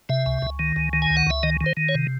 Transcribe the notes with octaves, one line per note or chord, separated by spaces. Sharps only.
C3 E5
C#2
C#2
D#3
C#2
D#3
G#5
C#2
F#5
C#2 E5
D#3 D#5
D#3
C5
D#3
C#5
C3